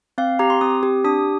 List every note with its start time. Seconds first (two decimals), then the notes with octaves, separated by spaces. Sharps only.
0.18 C4 F5
0.39 G4 A#5
0.50 C6
0.61 C4 D#6
0.83 G4
1.04 D4 D#6